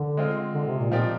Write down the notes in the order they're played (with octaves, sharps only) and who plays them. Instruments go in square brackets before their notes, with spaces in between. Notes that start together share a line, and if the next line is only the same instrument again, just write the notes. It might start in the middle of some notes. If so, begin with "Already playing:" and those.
Already playing: [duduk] D3
[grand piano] G#3 C4 F4
[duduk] D3
C3
A#2
[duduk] A#2 [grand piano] F3 C4 D#4 G4 D5